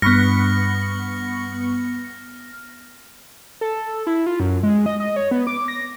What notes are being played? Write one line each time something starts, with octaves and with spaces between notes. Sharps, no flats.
G2 B3 B5 C#6 F6 A#6 C#7
A4
E4
F4
F#2
G#3
D#5
D#5
C#5
B3
D6
A#6